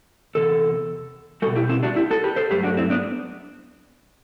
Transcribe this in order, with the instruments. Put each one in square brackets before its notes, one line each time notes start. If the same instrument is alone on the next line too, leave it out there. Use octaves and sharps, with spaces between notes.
[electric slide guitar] E2 C3 A4
G3 F#4 A4
B2
E4 G4
C4 E4
D4 F#4
E4 G4
F#4 A4
G4 B4
A4 C5
G2 F#3 A3 G4 B4
D4 F#4
C4 E4
B3 D4